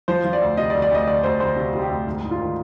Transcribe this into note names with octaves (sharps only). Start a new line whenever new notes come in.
F3 C5
F3
D5
D2
C3 D#5
D5
D2
D5
D2 D#5
D2 D5
D2 C5
D2 C5
C3
C3
G4
D2
G#2
G#2
F4
D#3